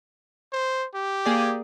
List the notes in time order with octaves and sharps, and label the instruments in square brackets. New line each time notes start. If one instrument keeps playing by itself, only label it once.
[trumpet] C5
G4
[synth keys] A#3 G#4 D5